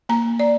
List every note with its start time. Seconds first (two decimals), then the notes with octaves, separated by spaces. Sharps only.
0.09 A#3 A#5
0.40 D5